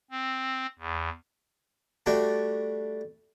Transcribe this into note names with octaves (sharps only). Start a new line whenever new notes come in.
C4
E2
G3 A3 D4 F#4